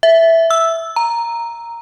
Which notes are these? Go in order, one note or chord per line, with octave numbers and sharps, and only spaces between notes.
E5
E6
A#5